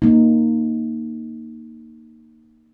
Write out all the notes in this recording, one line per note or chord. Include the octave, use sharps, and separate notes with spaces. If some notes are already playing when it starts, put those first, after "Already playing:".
A#3 D#4